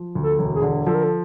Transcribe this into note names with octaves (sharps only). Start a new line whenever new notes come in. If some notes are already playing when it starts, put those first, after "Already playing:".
Already playing: F3
D2
A4
E1
G#4
D3
F3 A4
A#4
A4